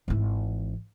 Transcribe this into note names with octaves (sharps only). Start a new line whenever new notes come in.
G#1 E3